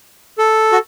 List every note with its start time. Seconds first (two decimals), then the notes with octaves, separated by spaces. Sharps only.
0.38 A4
0.72 F#4